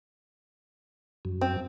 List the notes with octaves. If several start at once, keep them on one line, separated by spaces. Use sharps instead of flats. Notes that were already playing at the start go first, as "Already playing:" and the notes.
F#2
C4